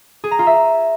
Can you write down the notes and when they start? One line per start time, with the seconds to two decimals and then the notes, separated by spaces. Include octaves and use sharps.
0.24 G#4
0.31 A#5
0.39 F4
0.47 E5